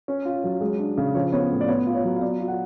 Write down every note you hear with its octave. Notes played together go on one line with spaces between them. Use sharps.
C#4
F4
F#3
G#3
D4
C#3
F3 C#5
B3 C#5
A2
D5
B3 C#5
F4
C#5
F#3
F5
B3 D5
F4
F#5